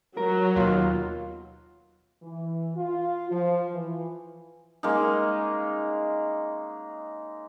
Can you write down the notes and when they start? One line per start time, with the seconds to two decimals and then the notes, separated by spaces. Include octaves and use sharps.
0.17 F#3 A#4
0.56 D#2 B2 F4
2.23 E3
2.76 F4
3.31 F3
3.73 E3
4.83 G#3 A#3 C#4 D#4